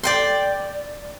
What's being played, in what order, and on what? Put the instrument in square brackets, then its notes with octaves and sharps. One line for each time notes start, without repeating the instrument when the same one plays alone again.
[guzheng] D5 G5 C6